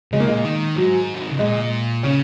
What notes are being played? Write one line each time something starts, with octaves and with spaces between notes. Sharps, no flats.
C#3 G#3
A#3
A#2 G#3
D#3
G#2 F#3
F#3
D#3
C#3
A#2 G#3
C#3 C#4